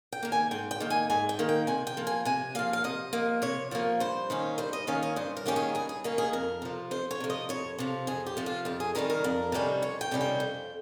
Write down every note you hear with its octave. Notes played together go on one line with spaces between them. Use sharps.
G5
D#3 A#3
G#5
G#2 G5
G5
D#3 A#3
G#5
G#2 G#5
G5
D#3 A#3
G5
C3 G#5
G5
F3 A#3
G#5
C3 G#5
F3 A#3 F5
F5
C3 D#5
F3 A#3
C3 C#5
F3 A#3 C#5
G2 C5
D#3 A#3 C#4
G2 C5
D#5
D#3 A#3 C#4 F5
D#5
G2 C5
A#4
D#3 A#3 C#4 G4
G#4
G2 G#4
G#4
D#3 A#3 C#4
G#4
F2 A#4
C3 F3
F2 C5
C#5
C3 F3
D#5
F2 C#5
C3 F3
F2 G#4
G4
C3 F3
F4
F2 G4
G#4
C3 D#3 G3 C#4 A#4
A#4
F2
C3 D#3 G3 C#4
F2 C#5
G5
C3 D#3 G3 C#4
G5
F2